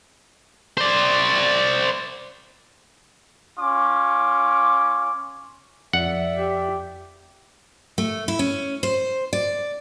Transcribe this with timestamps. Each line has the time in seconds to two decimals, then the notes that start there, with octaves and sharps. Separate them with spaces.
0.77 C5 D5
3.59 C#4 F4 D6
5.93 F2 D5 E5 F#5
6.36 G4
7.98 A3
8.28 E4
8.39 C#4
8.83 C5
9.33 D5